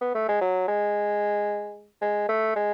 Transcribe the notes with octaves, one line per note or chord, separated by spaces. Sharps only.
B3
A3
G#3
F#3
G#3
G#3
A3
G#3